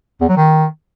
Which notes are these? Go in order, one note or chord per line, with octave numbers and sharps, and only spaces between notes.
E2
F#3
D#3